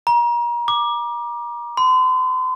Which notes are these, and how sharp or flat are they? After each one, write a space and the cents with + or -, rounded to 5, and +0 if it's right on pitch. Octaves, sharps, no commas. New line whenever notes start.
A#5 +35
D6 +15
C6 -40